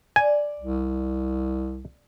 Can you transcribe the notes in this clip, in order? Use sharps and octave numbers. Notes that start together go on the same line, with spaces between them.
D5 G#5
C2